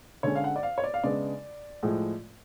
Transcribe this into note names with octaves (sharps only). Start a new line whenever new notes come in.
D3 G#3 C#4 C#5
F5
F#5
D5
F5
C#5
D5
F5
C#3 G#3 B3 D4 D5
A2 F3 G#3